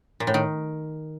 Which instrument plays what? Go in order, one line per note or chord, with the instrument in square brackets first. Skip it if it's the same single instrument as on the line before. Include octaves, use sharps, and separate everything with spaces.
[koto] A#2
A2
D#3